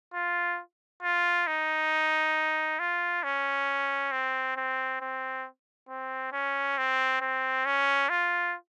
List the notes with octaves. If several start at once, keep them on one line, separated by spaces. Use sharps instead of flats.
F4
F4
D#4
F4
C#4
C4
C4
C4
C4
C#4
C4
C4
C#4
F4